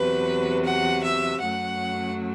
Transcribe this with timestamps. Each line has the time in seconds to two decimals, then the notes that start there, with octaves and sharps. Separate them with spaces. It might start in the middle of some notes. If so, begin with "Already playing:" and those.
Already playing: E2 C3 F#3 B4
0.66 F#5
1.04 E5
1.42 F#2 F#3 A3 F#5